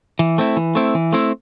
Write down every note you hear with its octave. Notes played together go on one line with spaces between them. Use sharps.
E3
A3 C4 E4
E3
A3 C4 E4
E3
A3 C4 E4